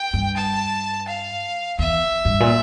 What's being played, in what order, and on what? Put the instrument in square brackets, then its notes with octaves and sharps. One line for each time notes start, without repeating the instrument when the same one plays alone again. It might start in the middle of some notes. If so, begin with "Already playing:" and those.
Already playing: [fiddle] G5
[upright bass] G2
[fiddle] A5
F5
[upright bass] E2 [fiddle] E5
[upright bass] G2
A#2